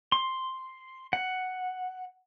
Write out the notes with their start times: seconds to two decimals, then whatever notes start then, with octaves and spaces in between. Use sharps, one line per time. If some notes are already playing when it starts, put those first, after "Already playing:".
0.12 C6
1.13 F#5